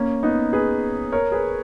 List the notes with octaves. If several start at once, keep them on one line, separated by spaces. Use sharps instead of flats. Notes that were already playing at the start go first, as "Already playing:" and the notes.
Already playing: A#3 C#4
B3 D#4
G#4 B4
A#4 C#5
G#4 B4